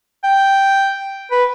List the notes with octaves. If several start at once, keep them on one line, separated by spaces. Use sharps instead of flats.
G5
B4